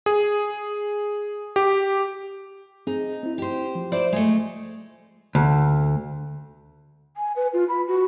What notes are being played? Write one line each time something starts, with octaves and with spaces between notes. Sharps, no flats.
G#4
G4
C4 D#4 G#4
C4 E4
G4 C5
F3
E4 C5 D5
G#3 A3
D2
G#5
B4
F4
B5
F#4